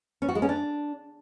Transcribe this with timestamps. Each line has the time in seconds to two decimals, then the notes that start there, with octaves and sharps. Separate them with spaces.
0.22 C#4
0.29 F#4
0.35 G#3
0.42 C#4
0.49 D4